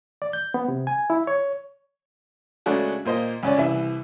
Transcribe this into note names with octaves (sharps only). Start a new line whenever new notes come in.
D5
G6
B3
C3
G#5
E4
C#5
C#3 G#3 A3 D4 F#4
A#2 A#3 C5 D#5
C#2 C#4 D5
C2 E3 E5